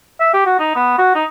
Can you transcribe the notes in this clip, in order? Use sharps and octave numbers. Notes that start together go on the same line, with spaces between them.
E5
G4
F#4
D#4
B3
F#4
D#4